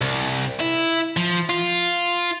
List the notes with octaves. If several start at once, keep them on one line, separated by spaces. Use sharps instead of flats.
C2
E4
F3
F4